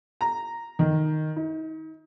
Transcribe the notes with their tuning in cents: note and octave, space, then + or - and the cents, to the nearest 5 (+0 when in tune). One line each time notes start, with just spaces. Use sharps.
A#5 -5
D#3 -5
D#4 +35